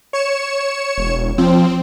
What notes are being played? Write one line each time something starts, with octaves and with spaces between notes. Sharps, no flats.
C#5 C#7 E7
E1
F3 C4